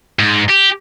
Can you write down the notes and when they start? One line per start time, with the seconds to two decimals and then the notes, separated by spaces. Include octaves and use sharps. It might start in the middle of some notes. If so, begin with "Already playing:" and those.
0.19 G#2
0.50 G4